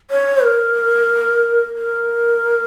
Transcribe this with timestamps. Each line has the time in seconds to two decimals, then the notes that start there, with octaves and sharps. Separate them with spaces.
0.11 C#5
0.44 A#4
1.76 A#4